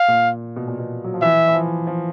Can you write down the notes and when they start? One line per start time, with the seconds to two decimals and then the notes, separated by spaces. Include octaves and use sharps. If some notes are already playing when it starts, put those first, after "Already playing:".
Already playing: F5
0.08 A#2
0.56 B2
0.68 A#2
0.79 B2
1.04 F#3
1.14 F3
1.22 E3 E5
1.48 E3
1.54 F3
1.87 F3